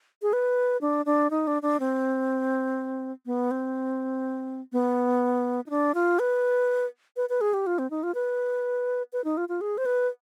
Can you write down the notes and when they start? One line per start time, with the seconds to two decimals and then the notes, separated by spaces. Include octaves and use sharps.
0.22 G#4
0.33 B4
0.81 D4
1.06 D4
1.31 D#4
1.47 D4
1.62 D4
1.80 C4
3.26 B3
3.51 C4
4.73 B3
5.66 D#4
5.70 D4
5.94 F4
6.19 B4
7.17 B4
7.29 B4
7.41 G#4
7.54 G4
7.67 F4
7.79 C4
7.90 D#4
8.03 F4
8.15 B4
9.13 B4
9.24 D#4
9.37 F4
9.49 F4
9.61 G#4
9.78 C5
9.86 B4